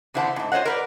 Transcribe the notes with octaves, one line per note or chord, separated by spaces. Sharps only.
E2 D3 E4 C5 F#5 A5
F2 G#2
F4 C5 C#5 D#5 F#5
A#4 B4 D5